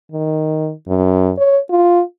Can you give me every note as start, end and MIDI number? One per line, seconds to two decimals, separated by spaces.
0.12 0.72 51
0.88 1.31 42
1.38 1.58 73
1.70 2.01 65